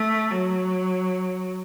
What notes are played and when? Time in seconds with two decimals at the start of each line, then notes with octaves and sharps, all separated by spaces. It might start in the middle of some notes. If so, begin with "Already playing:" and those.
Already playing: A3
0.31 F#3